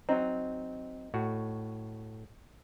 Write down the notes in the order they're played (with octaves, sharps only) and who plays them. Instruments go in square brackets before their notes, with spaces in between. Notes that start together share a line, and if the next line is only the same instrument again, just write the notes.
[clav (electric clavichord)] F#3 C4 [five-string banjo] D#4
[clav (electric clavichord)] A2 F#4